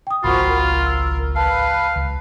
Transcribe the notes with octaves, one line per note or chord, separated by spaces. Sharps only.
G5 D#6
G#1 C#2 F3 A#3 F4 F#4 B5
A#4
E6
B4 F5 A5
C#2